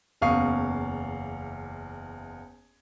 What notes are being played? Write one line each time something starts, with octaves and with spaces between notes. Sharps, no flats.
F#1 E2 F5 C#6 D#6 C7